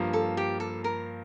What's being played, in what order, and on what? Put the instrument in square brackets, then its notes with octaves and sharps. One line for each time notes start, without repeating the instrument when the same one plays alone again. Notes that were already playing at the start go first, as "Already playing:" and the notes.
Already playing: [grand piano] G2 F3 A#3 F4
[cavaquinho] A4
G4
A4
A#4